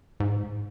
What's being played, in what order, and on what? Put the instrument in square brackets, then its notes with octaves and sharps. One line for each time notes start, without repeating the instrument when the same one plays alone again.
[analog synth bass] G#2